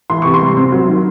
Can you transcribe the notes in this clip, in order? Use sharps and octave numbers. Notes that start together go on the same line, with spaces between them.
E3 C6
C3 C#6
C6
G3
C4
F#3
D#3